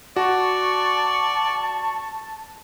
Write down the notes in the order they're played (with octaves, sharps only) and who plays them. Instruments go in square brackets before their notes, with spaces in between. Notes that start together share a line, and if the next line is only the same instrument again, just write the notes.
[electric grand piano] F#4 [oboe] D5 [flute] A5 [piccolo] C#6